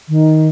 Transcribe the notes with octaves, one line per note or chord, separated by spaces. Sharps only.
D#3